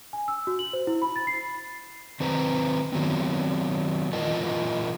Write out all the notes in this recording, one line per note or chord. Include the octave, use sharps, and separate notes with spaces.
G#5
E6
F#4
F#7
C5
E4
B5
A6
C7
D#3 C4 B4 C5 A#5
D#3 F#3 B3 C4
A#2 E3 F4 A#4 D#5 A5